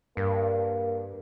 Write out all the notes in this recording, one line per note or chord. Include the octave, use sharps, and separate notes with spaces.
G2 A#3